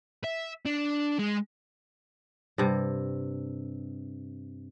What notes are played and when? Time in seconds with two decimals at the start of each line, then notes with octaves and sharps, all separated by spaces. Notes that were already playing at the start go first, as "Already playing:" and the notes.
0.24 E5
0.65 D4
1.19 G#3
2.58 G2 C3